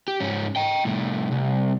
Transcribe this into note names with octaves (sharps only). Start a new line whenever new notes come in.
G4
G#2 C#4
D#5 G5
C2 A2
C2